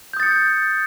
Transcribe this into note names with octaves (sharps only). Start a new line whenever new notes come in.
D#6 G6 A6 C#7